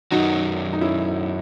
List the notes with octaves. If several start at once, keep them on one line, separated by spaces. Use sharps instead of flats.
F#2 D#3 F#3 D#4 F#4
D#4
C#4 E4